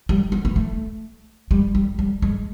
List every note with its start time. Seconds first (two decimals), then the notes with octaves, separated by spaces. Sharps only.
0.09 G3
0.32 B3
0.45 B3
0.56 A3
1.51 G3
1.75 G3
1.99 G3
2.22 G#3